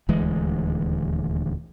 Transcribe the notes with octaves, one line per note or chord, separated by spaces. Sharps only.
D#1 D2 E3 G#3